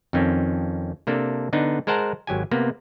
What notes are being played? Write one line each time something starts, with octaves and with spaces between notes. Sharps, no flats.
F2 D#3 C4 C#4
C3 A#3 D4 A4
D3 B3 D4 D#4
G#3 A#4 C5 F#5 A5 A#5
G#1 F#3 G4 G#5
C3 A#3 B3